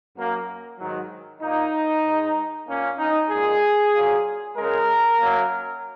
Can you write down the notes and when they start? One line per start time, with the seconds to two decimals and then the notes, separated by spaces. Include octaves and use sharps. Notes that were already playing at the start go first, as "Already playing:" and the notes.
0.16 F#2 F#3 A#3
0.78 G#2 D#3 F#3
1.42 A#2 A#3 D#4
2.04 G#2 G#3
2.68 A#2 A#3 C#4
2.99 D#4
3.31 A#2 G#3 G#4
3.93 A#2 F#3 A#3
4.57 C#3 G#3 A#4
5.19 F#2 F#3 A#3